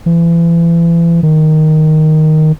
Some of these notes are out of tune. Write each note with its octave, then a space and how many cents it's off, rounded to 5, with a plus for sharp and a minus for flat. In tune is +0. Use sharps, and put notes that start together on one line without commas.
E3 +35
D#3 +0